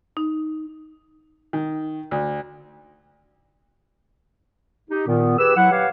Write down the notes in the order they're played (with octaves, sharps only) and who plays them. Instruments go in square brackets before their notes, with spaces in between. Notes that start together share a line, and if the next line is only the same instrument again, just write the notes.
[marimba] D#4
[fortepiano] D#3
D2
[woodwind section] D#4 G4
A#2 D#3 B3
G4 G#4 B4 E6
F#3 E4 F#5
G4 B4 C#5 F5 F#5